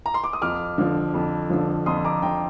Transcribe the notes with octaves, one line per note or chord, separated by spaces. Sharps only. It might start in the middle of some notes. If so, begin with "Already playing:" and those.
A#5
C6
D6
D#6
F2 D6 F6
D3 F3
F2
D3 F3
F2 C6 D#6
A#5 D6
D3 F3 G5 A#5